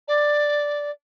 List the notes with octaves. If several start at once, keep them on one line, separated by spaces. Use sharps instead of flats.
D5